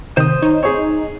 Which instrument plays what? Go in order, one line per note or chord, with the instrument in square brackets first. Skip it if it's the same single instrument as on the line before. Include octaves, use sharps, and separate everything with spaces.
[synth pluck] C3 D#3 [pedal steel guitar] C5 D#6
[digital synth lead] D#4 [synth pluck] C#5
[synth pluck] C4 [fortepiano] G#4 C#5